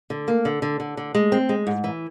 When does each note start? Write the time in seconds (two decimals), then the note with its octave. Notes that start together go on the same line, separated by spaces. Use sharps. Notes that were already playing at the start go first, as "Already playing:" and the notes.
0.10 D3
0.28 A#3
0.45 D3
0.62 D3
0.80 D3
0.97 D3
1.14 G#3
1.32 C4
1.49 G#3
1.67 G#2
1.84 E3